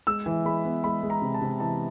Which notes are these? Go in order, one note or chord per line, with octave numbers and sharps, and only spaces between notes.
G#3 E6
E3
G#3 B5
B3
G#3 B5
G#3
A#5
C3
A5
C3
E3 A5